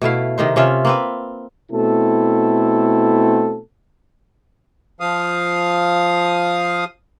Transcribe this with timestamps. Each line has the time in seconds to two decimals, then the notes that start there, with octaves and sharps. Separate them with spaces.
0.01 B2 A3 E4 F5
0.38 C3 D#3 D#4 C5
0.56 C3 C#4 F4 E5
0.85 A#3 C4 B4
1.72 B2 A3 C4 E4 A4
5.00 F3 F5 D#6